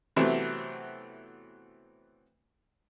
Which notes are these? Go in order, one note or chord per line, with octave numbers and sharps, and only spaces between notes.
C3 E3 F#3 A3 B3 C4